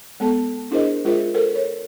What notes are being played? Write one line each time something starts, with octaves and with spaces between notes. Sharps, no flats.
G#3 B3 A4 A5
D4 E4 G#4 A#4 C5 D#5
G#3 F4 G#4 A#4 C5 E5
A4 A#4 C5
C#5